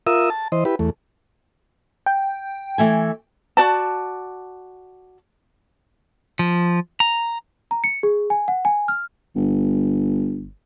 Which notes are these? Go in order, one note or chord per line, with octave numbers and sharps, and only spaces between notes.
F4 A#4 E5 D#6 E6
A5
E3 C5 D#5
E4 G4 B4
E2 A3
G5
E3 A3 G#5
F#4 D5 A5
F3
A#5
A#5
C#7
G#4
G#5
F#5
G#5
F6
G1